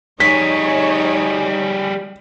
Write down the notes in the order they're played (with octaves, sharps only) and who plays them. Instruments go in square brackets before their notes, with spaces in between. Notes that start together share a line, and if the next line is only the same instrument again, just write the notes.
[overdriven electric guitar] G3 G#4 [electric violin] D#4 D#5 [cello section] C#5 [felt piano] B6